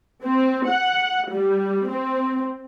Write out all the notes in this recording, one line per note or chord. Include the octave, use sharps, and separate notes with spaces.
C4
F#5
G3
C4